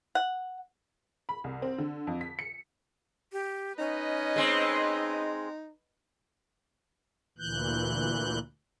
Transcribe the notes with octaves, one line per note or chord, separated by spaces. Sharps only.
F#5
B5
C2
C4
D3
F2
B6
C#7
G4
C#4 D#4 B4 D#5
G#3 C4
D2 A#2 E3 F#6 G6